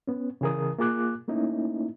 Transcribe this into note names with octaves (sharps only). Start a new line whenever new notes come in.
B3 C#4
C#3 E3 G#4 A#4 D#6
A#3 F4 G#4 D6 F#6
A3 A#3 C#4 D#4 E4